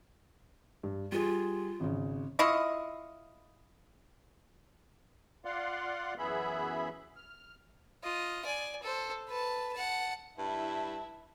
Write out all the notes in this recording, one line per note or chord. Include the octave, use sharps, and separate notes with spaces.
G2
G3 F4 G#4
G#1 C#3
E4 F4 D#5 C#6
F4 D5 F5 F#5 C6
F#2 E3 B3 G#4 E5 B5
F6
F4 D#5
D5 G#5
A4 C5
B4 A5
F#5 A5
G2 E4 E5 A5